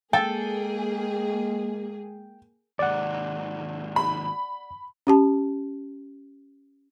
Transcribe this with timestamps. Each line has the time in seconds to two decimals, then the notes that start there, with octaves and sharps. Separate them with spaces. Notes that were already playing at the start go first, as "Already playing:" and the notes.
0.13 G#3 A#3 G#4 A4 G5
2.79 D#2 G#2 D5 F#5
3.96 B5
5.07 C#4 G4 A5